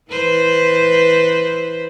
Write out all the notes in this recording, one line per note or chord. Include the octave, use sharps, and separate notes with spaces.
E3 B4 C5